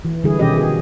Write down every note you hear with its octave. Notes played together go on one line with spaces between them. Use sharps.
E3
D3 E3 G3 E4 G#4
B2 D#3 E3 C#4 G4 D#5
G#4